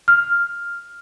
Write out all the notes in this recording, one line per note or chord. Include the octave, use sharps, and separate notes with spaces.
F6